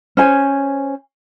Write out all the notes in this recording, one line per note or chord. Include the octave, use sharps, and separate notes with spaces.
C#4 C5 G#5